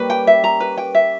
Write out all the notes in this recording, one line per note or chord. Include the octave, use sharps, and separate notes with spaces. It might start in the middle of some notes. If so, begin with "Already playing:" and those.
Already playing: G3 A#3 C#4 B4
G5
E5
A#5
B4
G5
E5